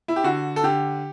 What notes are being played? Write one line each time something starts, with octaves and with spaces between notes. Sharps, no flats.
E4
G4
D3 F#4
A4
D3 G4